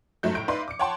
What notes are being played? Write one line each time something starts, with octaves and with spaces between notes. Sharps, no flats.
F#1 G#2 F#3 A3 G6
A2 G6 D7
D#4 B4 D5 E5 F5 C6
D6 C#7
C#5 F#5 G5 A5 C6